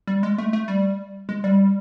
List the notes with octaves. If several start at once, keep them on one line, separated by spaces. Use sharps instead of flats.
G3
G#3
A3
A3
G3
G#3
G3